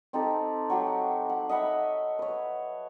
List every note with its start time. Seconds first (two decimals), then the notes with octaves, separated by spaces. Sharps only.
0.13 C4 D#4 G4 A4
0.70 F#3 F#4 G4
1.30 F#5
1.49 D#5 E5 F#5 B5
2.19 B4 C#5